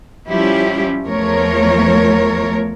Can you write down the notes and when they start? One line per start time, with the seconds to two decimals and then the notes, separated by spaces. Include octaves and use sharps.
0.29 F3 G3 C#4 E4 G4
1.07 E2 F3 A3 A#4 C#5